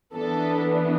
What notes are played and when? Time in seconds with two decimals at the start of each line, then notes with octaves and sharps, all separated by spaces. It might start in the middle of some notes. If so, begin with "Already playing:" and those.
0.13 E3 B3 D4 A4